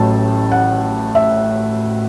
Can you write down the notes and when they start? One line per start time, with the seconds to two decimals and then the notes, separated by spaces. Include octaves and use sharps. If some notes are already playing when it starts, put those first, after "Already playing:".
Already playing: A1 A2 F#3 A5
0.52 F#5
1.15 E5